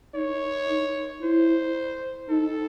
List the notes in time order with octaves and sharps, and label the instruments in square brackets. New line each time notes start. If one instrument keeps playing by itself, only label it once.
[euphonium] D#4 [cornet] C#5
[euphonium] D#4
[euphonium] E4 [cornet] C5
[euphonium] D#4 [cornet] A4